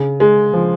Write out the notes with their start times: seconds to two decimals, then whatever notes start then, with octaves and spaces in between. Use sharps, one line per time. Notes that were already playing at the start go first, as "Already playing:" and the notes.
Already playing: C#3
0.20 G#3
0.53 F3